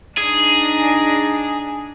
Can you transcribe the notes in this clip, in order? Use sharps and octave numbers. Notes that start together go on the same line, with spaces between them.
D4 D#4 G#4